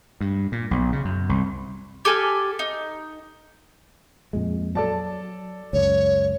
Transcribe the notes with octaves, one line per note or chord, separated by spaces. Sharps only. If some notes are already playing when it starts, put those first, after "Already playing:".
G2
A#2
B1
C#3
F#2
C2
G4 A4 G#5 F6
D#4
F2 A#2 G#3
F#3 A4 D5 A5
C#2 F#2 C#5